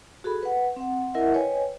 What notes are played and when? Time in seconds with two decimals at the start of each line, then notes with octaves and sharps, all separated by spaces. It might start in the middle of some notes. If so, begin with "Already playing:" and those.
0.24 F#4 G#4 A4 B5
0.43 B4 F#5
0.76 C4 F#5
1.14 E4 A#4 D#5 E5 F#5
1.34 B4 C#5 D#5 G5 G#5